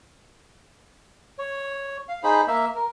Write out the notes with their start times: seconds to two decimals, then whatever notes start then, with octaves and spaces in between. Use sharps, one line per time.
1.39 C#5
2.09 F5
2.23 D#4 G#4 C5 B5
2.48 A#3 E5
2.75 A#4